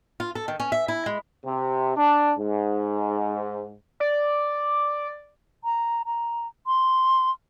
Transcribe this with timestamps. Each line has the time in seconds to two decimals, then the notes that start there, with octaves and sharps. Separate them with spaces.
0.20 F4
0.35 A4
0.48 D#3
0.60 C#4
0.72 E5
0.88 E4
1.06 G#3
1.45 C3
1.97 D4
2.38 G#2
4.00 D5
5.64 A#5
6.06 A#5
6.67 C6